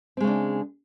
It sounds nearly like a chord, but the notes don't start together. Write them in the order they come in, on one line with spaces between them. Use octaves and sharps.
C4 G#3 C#3 D4